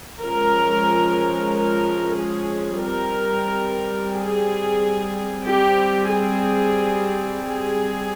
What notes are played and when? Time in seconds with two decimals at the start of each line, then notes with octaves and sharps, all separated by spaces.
0.21 F3 G#3 C#4 A#4
1.52 A#4
2.17 G#4
2.83 G3 C4 A#4
4.13 G#4
5.44 G3 C4 G4
6.09 G#4
7.40 G#4